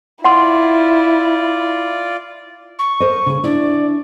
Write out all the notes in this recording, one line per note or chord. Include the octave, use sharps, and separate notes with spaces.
E4 F4 D5 F#5 C6
C#6
A#4 C5 D#5
C#3 G#4
D4 E4 D5